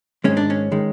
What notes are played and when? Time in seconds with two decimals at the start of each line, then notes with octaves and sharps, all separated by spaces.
0.24 G#2 D#3 G#3 C#4
0.37 D4
0.50 C#4
0.72 D#3 G#3